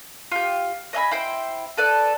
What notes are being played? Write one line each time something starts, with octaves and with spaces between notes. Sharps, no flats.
F4 G4
D#5 E5 G#5 B5
E4 C5 G5
A4 B4 D5